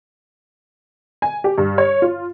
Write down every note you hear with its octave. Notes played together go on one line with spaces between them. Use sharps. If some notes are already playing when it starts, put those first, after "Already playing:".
G#5
G4
G2
C#5
F4